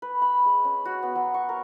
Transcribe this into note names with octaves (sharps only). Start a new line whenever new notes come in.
B4
B5
G#3
C#4
F#4
B3
F#3
C#6
A#4